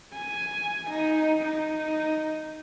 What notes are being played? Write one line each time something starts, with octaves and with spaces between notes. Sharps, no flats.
G#5
D#4
D#4